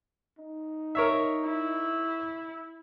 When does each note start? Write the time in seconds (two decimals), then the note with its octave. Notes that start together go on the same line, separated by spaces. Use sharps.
0.39 D#4
0.95 A#4 C#5 E5
1.45 E4